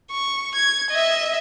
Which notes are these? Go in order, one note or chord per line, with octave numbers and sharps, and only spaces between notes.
C#6
G#6
D#5 E5